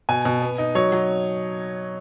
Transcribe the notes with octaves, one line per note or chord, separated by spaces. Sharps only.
B2 G#5
B2
B3
D#4
F#3 C#5
F#3